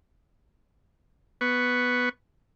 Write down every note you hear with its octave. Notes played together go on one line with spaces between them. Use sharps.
B3 B4 C#6